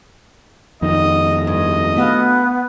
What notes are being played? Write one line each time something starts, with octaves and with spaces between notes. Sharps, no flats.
F2 D#3 D#5
G2 D#5
A3 B3 F#4 F5